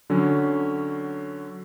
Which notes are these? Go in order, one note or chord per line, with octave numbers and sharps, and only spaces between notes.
D3 F#3 C#4